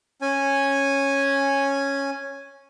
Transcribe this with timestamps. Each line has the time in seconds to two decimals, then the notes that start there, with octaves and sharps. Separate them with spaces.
0.22 C#4 G#5